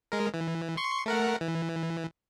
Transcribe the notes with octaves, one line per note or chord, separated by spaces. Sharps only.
G#3 A#4
E3
C6 C#6
A3 A#4 F#5
E3